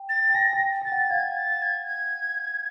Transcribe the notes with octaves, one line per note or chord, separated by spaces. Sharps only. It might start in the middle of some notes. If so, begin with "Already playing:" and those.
Already playing: G5
A6
G5
G#5 A#6
G5
G5 A6
F#5
F5 G#6
A6
G#6
G#6